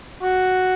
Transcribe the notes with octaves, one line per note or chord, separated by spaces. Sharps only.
F#4